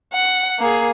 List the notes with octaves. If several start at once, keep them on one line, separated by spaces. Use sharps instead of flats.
F#5
A#3 G#4